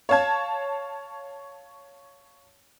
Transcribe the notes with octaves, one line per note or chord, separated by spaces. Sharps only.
C#5 F5 A5 G#6